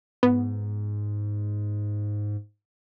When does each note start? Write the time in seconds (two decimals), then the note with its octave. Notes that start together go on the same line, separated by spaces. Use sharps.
0.23 G#2 B3